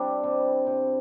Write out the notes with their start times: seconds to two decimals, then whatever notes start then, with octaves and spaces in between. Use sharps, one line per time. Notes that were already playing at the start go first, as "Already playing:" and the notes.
Already playing: G3 C4 D4 E4
0.24 C3
0.66 C3